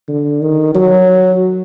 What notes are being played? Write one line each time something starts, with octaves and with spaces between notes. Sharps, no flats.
D3
D#3
F#3